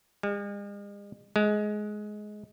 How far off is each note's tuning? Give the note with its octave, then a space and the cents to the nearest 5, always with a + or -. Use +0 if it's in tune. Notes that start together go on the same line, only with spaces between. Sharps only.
G#3 -45
G#3 +15